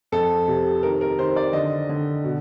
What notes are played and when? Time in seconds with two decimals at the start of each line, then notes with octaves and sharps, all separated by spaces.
0.12 F2 A4
0.48 C3
0.83 D#3 A#4
1.01 A#4
1.19 D#3 C5
1.36 D5
1.53 D3 D#5
1.89 D3
2.24 B2